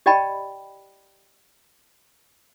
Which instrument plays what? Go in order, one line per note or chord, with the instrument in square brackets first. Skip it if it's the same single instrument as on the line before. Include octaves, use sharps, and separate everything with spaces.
[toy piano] G4 D5 D#5 G5 A5 B5